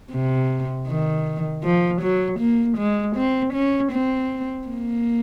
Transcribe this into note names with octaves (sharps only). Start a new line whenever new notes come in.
C3
D#3
F3
F#3
A#3
G#3
C4
C#4
C4
A#3